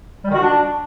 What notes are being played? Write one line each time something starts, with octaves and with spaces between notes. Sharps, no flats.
G3
D#3
F#4
D4